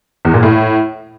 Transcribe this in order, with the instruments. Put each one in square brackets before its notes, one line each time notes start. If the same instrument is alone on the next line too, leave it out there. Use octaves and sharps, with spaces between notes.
[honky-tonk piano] E2
A#2
A2